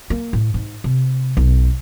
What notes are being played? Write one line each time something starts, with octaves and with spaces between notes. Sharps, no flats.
A#3
A2
G#2
C3
B1